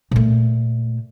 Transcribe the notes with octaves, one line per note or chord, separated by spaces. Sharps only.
A#2 A3